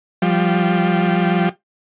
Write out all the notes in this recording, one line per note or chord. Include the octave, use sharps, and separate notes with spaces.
F3 G3